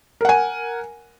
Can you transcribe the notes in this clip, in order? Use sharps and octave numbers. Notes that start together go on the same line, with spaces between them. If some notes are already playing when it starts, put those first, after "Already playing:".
A#4 F#5 G#5